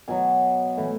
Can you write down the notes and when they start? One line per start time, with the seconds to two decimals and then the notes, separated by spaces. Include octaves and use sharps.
0.08 B2 F#3 G#5
0.77 A2 E3